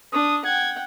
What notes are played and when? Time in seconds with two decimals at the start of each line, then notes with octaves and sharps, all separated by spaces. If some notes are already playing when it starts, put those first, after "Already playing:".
0.13 D4 D#6
0.45 F#5 G5 G#6